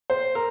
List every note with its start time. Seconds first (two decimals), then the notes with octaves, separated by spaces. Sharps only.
0.10 C5
0.35 A#4